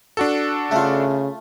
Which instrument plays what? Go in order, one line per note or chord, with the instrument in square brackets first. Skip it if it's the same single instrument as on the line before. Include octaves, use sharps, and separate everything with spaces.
[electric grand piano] D4 F#4 A4
[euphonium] C#3 [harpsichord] A3 F4